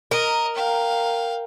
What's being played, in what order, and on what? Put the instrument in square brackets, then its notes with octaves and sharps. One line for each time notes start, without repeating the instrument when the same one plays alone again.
[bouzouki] A#4 [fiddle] D#5
[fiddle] F5 G5